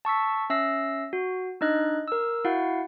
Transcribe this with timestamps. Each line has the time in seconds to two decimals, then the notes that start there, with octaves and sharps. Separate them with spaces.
0.05 A5 C#6 E6 B6
0.50 C#4 E5 E6 A#6 C7
1.13 F#4
1.61 D4 D#4 D#5 F#6
2.08 A#4 E6
2.45 E4 F#4 F5 F#5